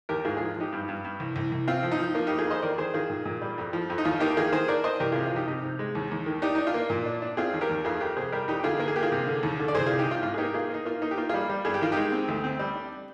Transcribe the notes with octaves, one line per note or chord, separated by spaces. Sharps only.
D#2 G4 A#4
G#2 F4 G#4
F3 F4 G#4
F3 D#4 G4
G2
G2
G2
C2
C2
C2
C4 F4
F3
D#4
F3
A#3 F4
F2 D#4 G4
F4 G#4
F2 C5 D#5
D#3 A#4 D5
D#3 G#4 C5
D#3 F4 G#4
A#2
A#2
G3
F2
F3
F2
D#4
D#2 F4
A#3 D#4 G4
D#3 F4 G#4
D#3 G#4 C5
D4 A#4 D5
D4 C5 D#5
C2 G4 A#4
C3 F4 G#4
F4
F3 D#4 G4
C3 D#4 G4
C3
G#3
D#2
D#2
D#3
D4 D#4 G4
D4 D#4
F4
A#3
A#2
D4
D4
C4 F4 G#4
D#2
G4 A#4
D#2
F2 F4 G#4
F2 G4 A#4
C3 G#4 C5
G3 G4 A#4
F2 D#4 G4
G4
D3 F4 G#4
A#3 A#4
G#4
A#3 G4
F4 G#4
C3
D3
D#2
D3
D5
C2 G#4 C5
C3 F4 G#4
D#4 G4
C3 F4
G#2 F4
G#4
A#3 D#4 G4
A#3 F4 G#4
A#3 D#4
A#3 F4
A#3 D#4
G4
A#3 F4
G3 F4 G#4
G3
G2 G#4
G4
D#3 F4
G#3 D#4 G4
C4
D2
C4
G3
D4